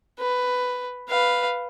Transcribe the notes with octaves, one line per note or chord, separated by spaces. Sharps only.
B4
B4 F5